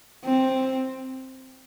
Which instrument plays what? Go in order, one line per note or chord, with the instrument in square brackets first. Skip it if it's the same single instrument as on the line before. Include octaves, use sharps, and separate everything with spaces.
[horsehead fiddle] C4